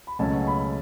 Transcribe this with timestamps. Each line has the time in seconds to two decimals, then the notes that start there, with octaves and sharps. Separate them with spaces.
0.07 B5
0.19 C#2 B2 F#3 A3 C#4 A5
0.47 B5